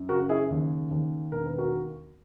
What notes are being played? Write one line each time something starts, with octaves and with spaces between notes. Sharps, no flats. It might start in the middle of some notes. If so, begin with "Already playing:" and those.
Already playing: F#2
C#3 F#4 A#4
E4 G#4
D#2
D#2
E1 A#4
B4
F#4 A#4